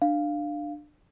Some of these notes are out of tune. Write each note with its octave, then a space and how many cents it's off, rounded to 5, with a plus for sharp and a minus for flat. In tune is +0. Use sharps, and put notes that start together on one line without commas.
D4 +20 F5 +0